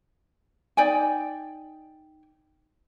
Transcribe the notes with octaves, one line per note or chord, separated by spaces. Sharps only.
D#4 D5 G5 G#5